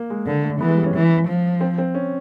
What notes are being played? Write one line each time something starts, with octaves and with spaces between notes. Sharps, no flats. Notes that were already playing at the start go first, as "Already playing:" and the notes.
Already playing: A#3
G#3
D3 A#3
A3
E3 B3
G#3
G3
C#4
E3
F3
C4
C4
C#4